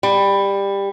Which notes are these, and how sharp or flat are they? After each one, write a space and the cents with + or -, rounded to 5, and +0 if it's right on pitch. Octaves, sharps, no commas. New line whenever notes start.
G3 +15